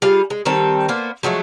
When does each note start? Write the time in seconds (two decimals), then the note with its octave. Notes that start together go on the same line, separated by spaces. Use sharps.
0.02 G3 F4 G#4 F5
0.30 G#3
0.45 D#3 G3 C4 A4
0.88 A#3 B3 C5
1.23 F3 F#3 G#3 A3